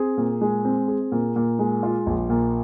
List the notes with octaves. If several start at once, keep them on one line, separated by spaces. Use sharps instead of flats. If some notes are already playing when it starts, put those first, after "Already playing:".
Already playing: C4 G#4
A#2
G#3
C4
G#4
A#2
A#2
G#3
F4
A#1
A#2